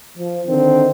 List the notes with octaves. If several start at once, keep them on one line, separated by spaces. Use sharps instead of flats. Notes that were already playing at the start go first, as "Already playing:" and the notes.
F3
D3 D#3 C4